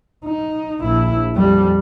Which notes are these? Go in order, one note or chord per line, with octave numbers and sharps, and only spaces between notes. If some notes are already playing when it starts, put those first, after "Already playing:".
D#4
A#1 E4
F2 G3